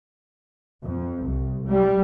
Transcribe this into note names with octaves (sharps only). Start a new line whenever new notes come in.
F2
C2
G3